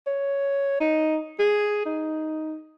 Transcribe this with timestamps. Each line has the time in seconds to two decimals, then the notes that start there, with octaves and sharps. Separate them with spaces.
0.07 C#5
0.81 D#4
1.40 G#4
1.86 D#4